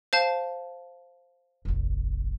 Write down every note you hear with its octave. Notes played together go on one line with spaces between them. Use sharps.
C5 F5 A5
F1 A#1